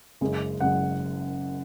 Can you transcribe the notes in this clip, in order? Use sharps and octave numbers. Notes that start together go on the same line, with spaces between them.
F#1 F#2 C#3 G#3
F#1 F#2 C#3 G#3 F#5